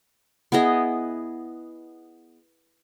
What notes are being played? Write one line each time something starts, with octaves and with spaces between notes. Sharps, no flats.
B3 E4 G#4 D#5